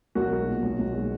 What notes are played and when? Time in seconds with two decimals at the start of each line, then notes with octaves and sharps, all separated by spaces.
0.15 B1 F#4 A#4
0.31 G#3
0.47 A#2
0.62 B1
0.79 B1
0.94 G#3